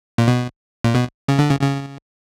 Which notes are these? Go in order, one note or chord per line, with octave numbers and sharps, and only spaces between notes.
A#2
B2
A#2
B2
C#3
D3
C#3
C#3